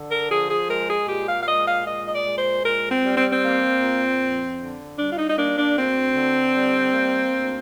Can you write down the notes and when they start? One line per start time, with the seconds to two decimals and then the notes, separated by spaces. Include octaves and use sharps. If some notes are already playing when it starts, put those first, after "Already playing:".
Already playing: D3
0.10 A#4
0.30 F3 G#4
0.49 G#4
0.69 G#3 A#4
0.89 G#4
1.08 A#2 G4
1.27 F5
1.42 F5
1.47 G#3 D#5
1.66 F5
1.85 A#2 D#5
2.07 D#5
2.12 D5
2.24 G#3
2.38 C5
2.63 A#2 A#4
2.91 C4
3.04 G3
3.17 C4
3.32 C4
3.43 A#3
3.81 A#2
4.20 F2
4.59 D3
4.98 G3 D4
5.11 F4
5.18 D#4
5.29 D#4
5.38 A#3 D4
5.56 D4
5.76 D2 C4
6.15 D3
6.54 G3
6.93 A#3
7.32 D2